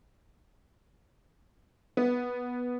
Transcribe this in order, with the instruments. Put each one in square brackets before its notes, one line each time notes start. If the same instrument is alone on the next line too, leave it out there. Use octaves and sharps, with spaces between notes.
[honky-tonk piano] B3